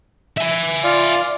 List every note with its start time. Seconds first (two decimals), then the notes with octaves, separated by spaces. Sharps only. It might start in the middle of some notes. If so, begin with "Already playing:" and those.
0.37 E5 G#5
0.84 F4 D5 F5